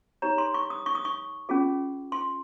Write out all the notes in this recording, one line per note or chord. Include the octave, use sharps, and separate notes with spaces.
D#4 G4 C#5 A#5
C6
C#6
D#6
C#6
D#6
C#6
C#4 F4 G#4
C6